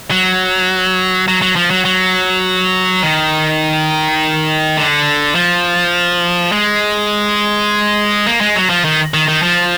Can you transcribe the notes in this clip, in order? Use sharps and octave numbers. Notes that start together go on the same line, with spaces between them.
F#3
F#3
F#3
F3
F#3
F#3
D#3
D3
F3
G#3
A#3
G#3
F#3
F3
D#3
D#3
D#3
F3